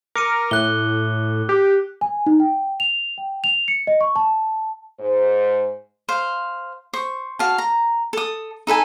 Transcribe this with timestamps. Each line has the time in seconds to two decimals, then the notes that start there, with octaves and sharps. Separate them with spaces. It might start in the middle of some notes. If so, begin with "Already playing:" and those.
0.15 A#4 D6 C#7 D#7
0.51 A2 F#6 G7
1.49 G4
2.01 G#5
2.26 D#4
2.40 G5
2.80 F7
3.18 G5
3.44 F7
3.68 C#7
3.87 D#5
4.01 C#6
4.16 A5
4.99 G#2 C5
6.09 C5 F5
6.93 C5 C#6
7.39 F#4 F5 A5
7.58 A#5
8.13 A4 D#6
8.67 D#4 A4 B4 G#5